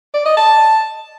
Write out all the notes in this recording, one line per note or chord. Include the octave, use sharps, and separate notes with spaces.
D5
D#5
A5